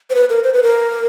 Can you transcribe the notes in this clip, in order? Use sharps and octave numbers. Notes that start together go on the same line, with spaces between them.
C5
B4
A#4
C5
B4
A#4